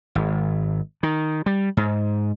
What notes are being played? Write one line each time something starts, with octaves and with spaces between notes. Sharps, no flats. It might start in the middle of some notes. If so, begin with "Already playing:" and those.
G#1
D#3
G3
G#2